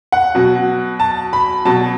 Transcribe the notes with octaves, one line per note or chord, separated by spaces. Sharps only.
F#5
B2 F#3
A5
B5
B2 F#3 A5